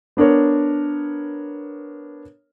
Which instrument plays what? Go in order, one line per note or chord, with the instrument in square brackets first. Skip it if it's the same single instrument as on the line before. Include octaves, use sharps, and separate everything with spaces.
[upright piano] B3 D4 A#4 C#5